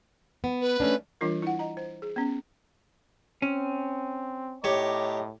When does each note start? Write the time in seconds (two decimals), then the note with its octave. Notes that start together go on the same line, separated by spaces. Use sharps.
0.44 B3
0.61 B4
0.80 A3 C#4 D4
1.21 E3 G3 D4 F4 A#4
1.42 E4 F#5
1.59 D#5 A#5
1.77 C5
2.02 G#4
2.16 B3 C#4
3.42 C4 C#4
4.64 A2 G4 C#5 D#5 A#5 D6